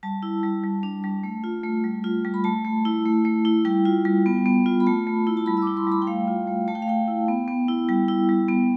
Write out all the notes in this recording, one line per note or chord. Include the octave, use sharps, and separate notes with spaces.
G3 A5
E4
G3
G3
D4
G3
A3
F4
A3
G3
F4
G3
B5
A3 A5
A3
E4
A3
A3
E4
G3 G5
F4
G3
B3
B3
F4
B5
A3 A5
A3
E4
A5
G3 B5
E6
D6
E4
C6
G3 B5
G5
A3 F5
F4
A3
A3 A5
G5
F5
A3 G5
E4
B3
B3
E4
G3 G5
E4
G3
B3